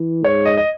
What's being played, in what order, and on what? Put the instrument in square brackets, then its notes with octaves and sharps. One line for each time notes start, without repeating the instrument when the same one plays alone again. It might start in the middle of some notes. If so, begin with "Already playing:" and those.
Already playing: [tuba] E3
[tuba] G#2 [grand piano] C#5
[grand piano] D#5
D#5